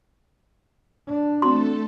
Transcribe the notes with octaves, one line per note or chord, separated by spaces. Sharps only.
D4
A3 C4 F#4 A4 C6